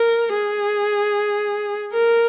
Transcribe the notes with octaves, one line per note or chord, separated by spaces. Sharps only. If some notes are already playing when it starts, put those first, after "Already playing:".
Already playing: A#4
G#4
A#4